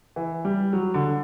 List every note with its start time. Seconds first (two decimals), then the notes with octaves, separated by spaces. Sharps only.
0.16 E3
0.45 G3
0.73 F#3
0.94 D3